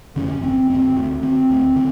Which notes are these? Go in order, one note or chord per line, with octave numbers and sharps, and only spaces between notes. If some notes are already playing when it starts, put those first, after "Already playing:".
F#2 D3 C#4
G#1 C4
F#2 D3 C4
D2
D3 C4
D2
D3